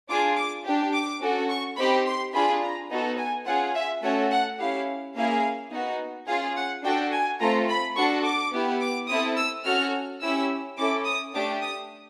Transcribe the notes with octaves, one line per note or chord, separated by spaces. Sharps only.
D4 F4 G#4 D6
D6
D4 G4
D6
C#4 F#4 A4
C#6
C4 D#4 G4 B5
C6
D4 F4 G#4 B5
A#5
B3 D#4 F#4 A4
G#5
C#4 F4 G#4 F#5
E5
A3 C#4 F#4 A4 C#5
F#5
C#4 E4 G4 F5
A#3 C#4 E4 G#4 F5
B3 D#4 F#4
C#4 F4 G#4 F5
F#5
D4 F#4 A4 G5
G#5
A3 C4 F4 A4 A#5
B5
D4 F#4 A4 C#6
D6
B3 E4 G4
D6
C4 E4 A4 D#6
E6
C#4 F#4 A4 F6
C#4 E4 G4 E6
C#4 E4 A4 D6
D#6
A3 D4 G4 D6
D#6